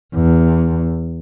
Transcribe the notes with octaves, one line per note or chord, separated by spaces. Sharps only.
E2